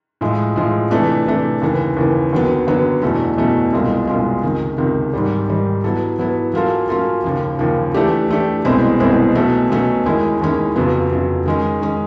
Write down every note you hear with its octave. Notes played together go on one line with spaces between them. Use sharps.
A2 F3 G#3
A2 F3 G#3
C3 E3 A3 D4
C3 E3 A3 D4
D#2 C#3 E3
D#2 C#3 E3
D#2 D3 F#3 B3
D#2 D3 F#3 B3
E2 B2 F#3 A3 C#4
E2 B2 F#3 A3 C#4
C2 B2 G#3 C#4 F4
C2 B2 G#3 C#4 F4
C#2 C3 D#3
C#2 C3 D#3
G#2 D#3 G3
G#2 D#3 G3
F#3 B3 E4 A4
F#3 B3 E4 A4
F#3 A#3 C#4 F4 A4
F#3 A#3 C#4 F4 A4
D#2 C#3 F3
D#2 C#3 F3
E3 A3 D4 G4
E3 A3 D4 G4
C2 B2 G#3 C4 E4
C2 B2 G#3 C4 E4
B2 F#3 A3 C#4
B2 F#3 A3 C#4
D#2 D#3 G#3 C#4 E4
D#2 D#3 G#3 C#4 E4
F2 C#3 F#3 B3
F2 C#3 F#3 B3
D#3 G#3 C#4
D#3 G#3 C#4